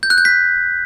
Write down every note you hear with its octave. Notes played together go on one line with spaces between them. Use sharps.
G6
F#6
G6
B6